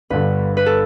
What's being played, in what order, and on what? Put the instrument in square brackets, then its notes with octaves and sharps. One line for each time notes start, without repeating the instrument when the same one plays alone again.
[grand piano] G1 G2 D3 [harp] B4
[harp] B4
A4